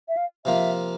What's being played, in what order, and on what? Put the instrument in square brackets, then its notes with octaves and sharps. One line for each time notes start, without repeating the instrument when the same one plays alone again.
[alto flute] E5
F5
[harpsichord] C3 F3 A#3 F4 [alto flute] E5